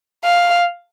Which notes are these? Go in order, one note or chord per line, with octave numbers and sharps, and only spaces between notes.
F5